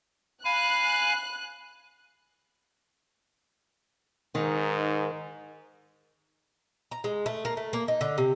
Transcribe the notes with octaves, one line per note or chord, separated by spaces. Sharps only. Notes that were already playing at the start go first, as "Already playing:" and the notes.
F5 G#5 B5 F#6
G#2 D#3
A#5
G#3
A3
A#3
A3
A#3
D#4
D3
C3